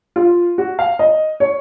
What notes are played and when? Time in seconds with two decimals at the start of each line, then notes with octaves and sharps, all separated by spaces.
0.16 F4
0.58 F#4
0.79 F5
0.99 D#5
1.40 C#5